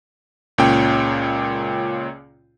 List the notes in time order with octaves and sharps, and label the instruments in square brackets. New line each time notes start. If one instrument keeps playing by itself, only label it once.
[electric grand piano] C#2 A#2 C#4 C#5 G5